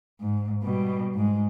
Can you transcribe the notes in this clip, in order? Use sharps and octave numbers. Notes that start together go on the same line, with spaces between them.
G#2
B2 G3
G#2 G#3